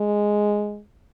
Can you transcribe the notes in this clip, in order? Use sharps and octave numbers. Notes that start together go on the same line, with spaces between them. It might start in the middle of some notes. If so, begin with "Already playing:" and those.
Already playing: G#3